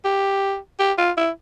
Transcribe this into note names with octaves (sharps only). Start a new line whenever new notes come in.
G4
G4
F4
E4